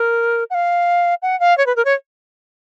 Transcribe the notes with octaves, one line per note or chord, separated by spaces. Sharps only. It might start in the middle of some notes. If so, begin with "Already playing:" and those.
Already playing: A#4
F#5
F5
F#5
F5
C#5
B4
A#4
C#5